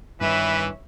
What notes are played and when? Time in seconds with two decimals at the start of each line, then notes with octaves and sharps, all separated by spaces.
0.21 G2 D#3 E3 B4 C#5 E5